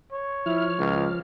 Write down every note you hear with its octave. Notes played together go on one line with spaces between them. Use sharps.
C#5
F3 E4 F6
C#2